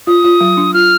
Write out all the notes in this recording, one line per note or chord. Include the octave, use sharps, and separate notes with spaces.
F4 D#6
F4
F#3
D4
F4 F6